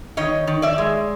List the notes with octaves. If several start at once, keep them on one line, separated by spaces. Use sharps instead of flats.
D#3 C#5 D#5
D#3
D5 E5
G#3